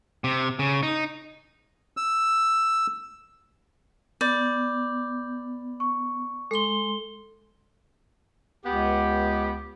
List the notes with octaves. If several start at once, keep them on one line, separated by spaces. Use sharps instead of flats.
C3
C#3
D#4
E6
B3 D5 D6 G6
C#6
G#3 A4 C6 G7
C#2 B3 G4